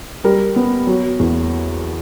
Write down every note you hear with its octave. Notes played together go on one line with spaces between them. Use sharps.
G3 A#4
B3
F#3
E2